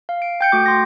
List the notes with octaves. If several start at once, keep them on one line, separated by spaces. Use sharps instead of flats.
F5
D7
G5 G6 C#7
A3 F#4 G5 D6
C6 A#6